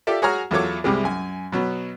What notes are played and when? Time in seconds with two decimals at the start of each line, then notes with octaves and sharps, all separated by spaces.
0.07 F4 G4 A4 D5 E5
0.22 F#4 G#4 C#5 G#5 A#5 F6
0.51 E2 F#3 F4 A4 C#5 D6
0.84 C2 C3 G3 G#3
1.04 F#2 G#5
1.52 B2 F#3 B3